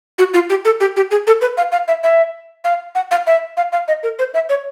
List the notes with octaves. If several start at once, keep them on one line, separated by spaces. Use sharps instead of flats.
F#4
F4
G4
A4
G4
G4
G#4
A4
B4
F5
F5
E5
E5
F5
F#5
F5
E5
F5
F5
D#5
A#4
C5
E5
C#5